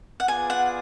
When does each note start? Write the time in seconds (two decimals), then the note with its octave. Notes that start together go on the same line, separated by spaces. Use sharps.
0.20 F#5
0.27 B3 F4 G#4 D5 G#5
0.50 F#5